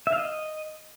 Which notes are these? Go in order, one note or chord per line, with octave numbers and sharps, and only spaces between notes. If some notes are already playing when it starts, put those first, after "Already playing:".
E5
F5
D#5